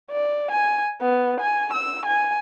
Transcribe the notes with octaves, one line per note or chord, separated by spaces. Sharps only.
D5
G#5
B3
G#5
E6
G#5